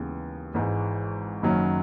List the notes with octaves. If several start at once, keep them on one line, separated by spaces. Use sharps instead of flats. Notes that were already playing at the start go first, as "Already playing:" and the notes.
Already playing: D#2 C#3 E3 G#3 B3
G#1 G#2 E3
F#1 F#2 D#3 F#3 C#4